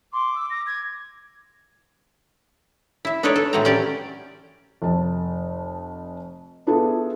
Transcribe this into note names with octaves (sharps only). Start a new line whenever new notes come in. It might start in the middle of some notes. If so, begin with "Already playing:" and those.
C6 D6
E6
A#6
G#6
E4 E5
D4 D#4 A4 B4 C#5 D5
A4
A2 E3 F#3 A3 C4 A#5
C#4 G4 D5
F1 A5
B3 D4 E4 F4 G#4 A4